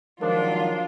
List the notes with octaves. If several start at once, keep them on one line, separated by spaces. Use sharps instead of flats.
D#3 F3 F#3 G#3 D4 F4 A#4